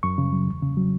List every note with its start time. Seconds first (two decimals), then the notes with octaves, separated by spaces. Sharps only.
0.03 F#2 C#6
0.18 C#3
0.33 F#3
0.47 E2
0.62 C#3
0.77 F#3